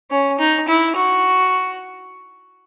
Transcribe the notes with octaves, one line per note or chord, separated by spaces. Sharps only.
C#4
D#4
E4
F#4